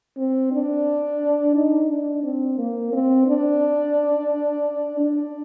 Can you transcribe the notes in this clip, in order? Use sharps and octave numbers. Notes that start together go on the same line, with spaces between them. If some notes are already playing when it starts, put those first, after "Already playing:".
C4
D4
D#4
D4
C4
A#3
C4
D4
D4